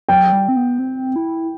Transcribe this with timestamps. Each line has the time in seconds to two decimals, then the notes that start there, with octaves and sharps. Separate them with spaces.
0.09 F#3 G5
0.32 G3
0.48 C4
0.56 B3
0.79 C4
1.16 E4